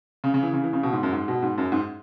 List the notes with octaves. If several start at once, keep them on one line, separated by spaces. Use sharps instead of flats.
C#3
C#3
E3
C#3
E3
C#3
B2
G#2
F#2
G#2
B2
G#2
F#2
G#2